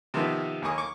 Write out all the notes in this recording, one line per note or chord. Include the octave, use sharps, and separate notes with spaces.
C3 D#3 F3 B3
D#2 A#3 A#4 G#5 C#6 D#6
C#6 D6